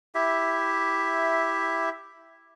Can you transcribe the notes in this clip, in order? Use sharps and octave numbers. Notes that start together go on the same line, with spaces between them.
E4 G4 E5